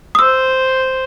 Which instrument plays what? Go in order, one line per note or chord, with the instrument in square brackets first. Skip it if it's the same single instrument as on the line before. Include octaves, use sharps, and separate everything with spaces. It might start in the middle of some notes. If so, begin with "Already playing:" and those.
[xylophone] D#6
[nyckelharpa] C5 [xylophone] E6